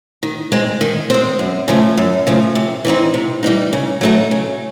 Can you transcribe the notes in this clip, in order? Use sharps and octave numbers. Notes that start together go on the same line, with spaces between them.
D#3
G#3 C4
D#3
G#3 C4
F#2
C#3 F3 A3
F#2
C#3 F3 A3
C3
E3 G3 C4 D#4
C3
E3 G3 C4 D#4
C#3
F#3 A3 C4 D#4
C#3